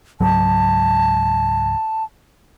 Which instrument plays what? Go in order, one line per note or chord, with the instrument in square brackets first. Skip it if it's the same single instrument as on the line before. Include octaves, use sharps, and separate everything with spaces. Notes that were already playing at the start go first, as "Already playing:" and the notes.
[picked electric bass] C#2 G#2 F#3 [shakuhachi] A5